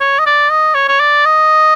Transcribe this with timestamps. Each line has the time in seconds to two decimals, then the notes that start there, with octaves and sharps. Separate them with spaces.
0.01 C#5
0.19 D#5
0.26 D5
0.51 D#5
0.75 C#5
0.88 C#5
1.00 D5
1.25 D#5